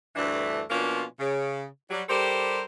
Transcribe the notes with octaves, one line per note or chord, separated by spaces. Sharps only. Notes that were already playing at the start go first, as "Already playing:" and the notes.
D2 G2 E3 A3 D4
B2 F3 A#3 C#4 D4 F4
C#3
F#3 G3
G3 G4 A4 A#4 C5